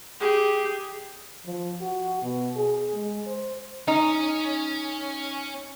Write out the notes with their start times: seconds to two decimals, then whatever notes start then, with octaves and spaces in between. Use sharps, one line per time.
0.20 G4 G#4
1.45 F3
1.81 F#4
2.22 B2
2.55 G#4
2.94 G#3
3.27 C5
3.88 C#4 D#4